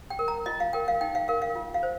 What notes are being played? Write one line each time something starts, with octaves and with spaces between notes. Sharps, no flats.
G5
A#4
A#5
F4 D#5
F5
A#4 G5
F5
D#4 G5
F5
A#4 F5
F5
F4
F5
C5